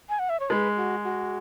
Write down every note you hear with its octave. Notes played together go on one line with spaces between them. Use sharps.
G#5
F#5
E5
C#5
G#3 B4
F#4
F#4